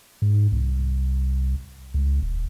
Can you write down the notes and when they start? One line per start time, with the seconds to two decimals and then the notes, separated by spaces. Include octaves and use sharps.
0.22 G#2
0.52 C2
1.94 C#2
2.22 D#1